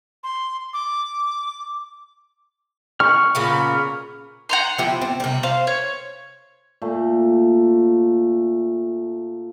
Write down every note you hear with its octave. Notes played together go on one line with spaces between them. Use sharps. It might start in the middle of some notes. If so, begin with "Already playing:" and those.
C6
D6
C#6 F6
A#2 C#3 B3
F#5 A#5 C6
F3 E4 G4
C4
C3 G3
C5 F5
C#5
A#2 A3